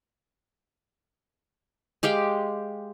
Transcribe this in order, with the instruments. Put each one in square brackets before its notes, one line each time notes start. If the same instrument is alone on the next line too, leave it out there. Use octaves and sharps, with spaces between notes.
[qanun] G#3 G4 F5 G5